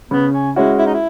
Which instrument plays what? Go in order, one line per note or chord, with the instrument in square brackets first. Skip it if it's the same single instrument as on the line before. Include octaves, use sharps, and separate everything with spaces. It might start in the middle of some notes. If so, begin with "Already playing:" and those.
[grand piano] C#3 [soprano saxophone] B3
[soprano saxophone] C#4
[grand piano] G#3 C#4 F#4 [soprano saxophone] E4
[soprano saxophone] E4
D#4
E4